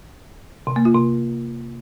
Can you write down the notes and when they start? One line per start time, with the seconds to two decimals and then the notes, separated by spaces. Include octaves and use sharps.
0.67 C3
0.76 A#3
0.85 F4
0.95 C3